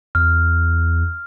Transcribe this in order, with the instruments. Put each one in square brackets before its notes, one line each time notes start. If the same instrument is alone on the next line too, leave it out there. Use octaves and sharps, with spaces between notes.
[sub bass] E2 [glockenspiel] F6